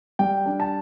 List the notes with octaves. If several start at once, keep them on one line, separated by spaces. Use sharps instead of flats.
G3 G5
D4
A5